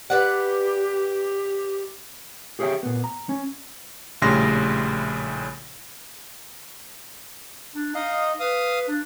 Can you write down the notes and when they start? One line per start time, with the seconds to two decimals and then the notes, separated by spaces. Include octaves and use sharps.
0.10 G4 B4 D5 F#5
2.59 G4 G#4 C#5 D5 E5 G5
2.83 A#2 B3
3.04 A#5
3.29 C#4
4.22 A#1 A2 C#3 G3 C6 A#6
7.75 D4
7.95 D#4 D#5 F5
8.40 B4 F5 D#6
8.88 D4